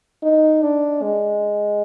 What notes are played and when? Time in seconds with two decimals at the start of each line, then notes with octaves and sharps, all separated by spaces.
0.23 D#4
0.62 D4
1.02 G#3